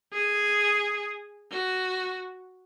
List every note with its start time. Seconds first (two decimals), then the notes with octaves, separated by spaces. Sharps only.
0.13 G#4
1.52 F#4